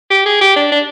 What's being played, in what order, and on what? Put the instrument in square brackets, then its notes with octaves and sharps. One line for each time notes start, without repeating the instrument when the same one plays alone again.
[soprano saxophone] G4
G#4
G4
D4
D4